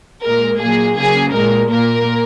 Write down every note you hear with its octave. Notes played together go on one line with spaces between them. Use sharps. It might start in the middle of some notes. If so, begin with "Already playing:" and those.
A#2 G#3 A#4
A#2 F#3 A#3 G#4
C#3 F#3 A#3 G#4
A#2 G#3 A#4
A#2 A#3 A#4